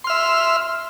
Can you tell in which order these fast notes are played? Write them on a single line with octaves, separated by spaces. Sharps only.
C6 F6 E5